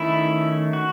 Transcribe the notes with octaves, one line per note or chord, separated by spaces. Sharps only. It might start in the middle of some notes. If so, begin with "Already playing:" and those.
Already playing: D#3 A3 C#4 E4
F#4